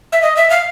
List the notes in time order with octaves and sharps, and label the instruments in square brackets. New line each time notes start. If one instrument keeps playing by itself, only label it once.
[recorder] E5
D#5
E5
F5